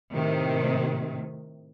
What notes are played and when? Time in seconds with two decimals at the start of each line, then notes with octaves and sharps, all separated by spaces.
0.12 A2 C3 D#3